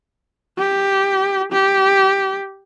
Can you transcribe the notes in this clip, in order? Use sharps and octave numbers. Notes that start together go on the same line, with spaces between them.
G4
G4